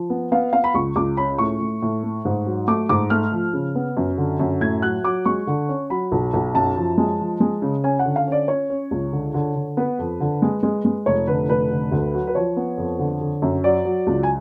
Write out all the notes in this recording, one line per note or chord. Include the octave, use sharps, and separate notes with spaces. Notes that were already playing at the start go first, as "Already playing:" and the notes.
Already playing: F3
B3
B3 F5
B3 F5
B5
C#2 C#6
C#2 D6
C#4 B5
A2 C#6
A2
A2
A3
G#2
F#3
A3 D6
G#2 D6
A3 F6
F3
C#3
B3
F#2
D3
F#2
A2 G#6
F#3 F#6
F#3 D6
G#3 C#6
D3
C#4
F#3 B5
B1
B1
F#2 A5
F3
G#3
F3
G#3
C#3
C#4 G#5
F#5
D3
F5
C#4 D5
C#4 C#5
C#4
C#2
D3
D3
D3
B3 B4
F2
D3
G#3
G#3
G#3
F1 C#5
D3 B4
F1 B4
D3
D2
F#3
B4
F3 C#5
B3
F2
D3
D3
F#2
F#3 D5
F#3
C#2
G#5